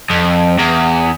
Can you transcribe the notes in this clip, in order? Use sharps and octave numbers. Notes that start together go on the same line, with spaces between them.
F2
E2